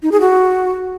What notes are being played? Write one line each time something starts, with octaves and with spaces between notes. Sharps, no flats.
D#4
G#4
F#4